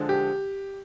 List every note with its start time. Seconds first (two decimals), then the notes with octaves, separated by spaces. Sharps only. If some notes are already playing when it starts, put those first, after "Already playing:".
Already playing: D3 F3 G#3
0.09 G4